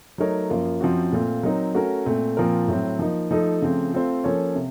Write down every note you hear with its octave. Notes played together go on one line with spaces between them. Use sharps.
F#3 A3 D#4 A#4 C#5
F#2 F3 A#3 F4
F#2 F3 C4 F#4
A#2 A3 C4 F4
F#3 C4 D#4 A#4
A3 C#4 F#4 A#4
A#2 A3 C4
A#2 F3 C4 F4 A#4
A2 F#3 C4
F3 A#3 D#4
F3 A3 D#4 A4
C#3 F3 A3 C4
A3 C4 F4 A4 C5
F3 A#3 C#4 A4 C#5
C3